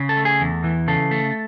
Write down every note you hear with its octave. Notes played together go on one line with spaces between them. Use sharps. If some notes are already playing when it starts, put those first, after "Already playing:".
Already playing: C#3
A4
A3
G#4
E2
E3
C#3 A4
A3